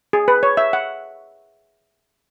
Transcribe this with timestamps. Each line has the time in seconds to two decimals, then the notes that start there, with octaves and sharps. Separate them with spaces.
0.13 G#4
0.28 B4
0.43 C#5
0.57 E5
0.73 F#5